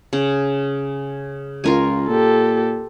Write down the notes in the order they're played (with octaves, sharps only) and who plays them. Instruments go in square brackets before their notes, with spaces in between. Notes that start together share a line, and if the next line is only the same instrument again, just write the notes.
[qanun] C#3
[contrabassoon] C#2 [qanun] F4 A#4 G#5
[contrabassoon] A#2 [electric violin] G4 A4